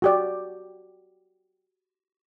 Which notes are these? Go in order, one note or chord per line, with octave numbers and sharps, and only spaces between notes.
F#4 G4 D5